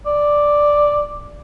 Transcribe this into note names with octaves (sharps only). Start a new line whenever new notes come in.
D5